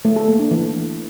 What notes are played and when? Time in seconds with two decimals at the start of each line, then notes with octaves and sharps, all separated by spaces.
0.05 A3
0.16 A4
0.28 A#3
0.39 D4
0.51 E3